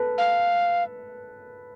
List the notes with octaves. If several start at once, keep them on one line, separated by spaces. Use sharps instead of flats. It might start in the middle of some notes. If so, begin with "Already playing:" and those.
Already playing: A4 B4
F5